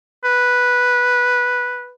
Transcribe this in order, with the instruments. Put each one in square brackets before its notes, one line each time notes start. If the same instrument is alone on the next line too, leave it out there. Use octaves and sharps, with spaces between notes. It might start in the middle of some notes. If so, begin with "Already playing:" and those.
[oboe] B4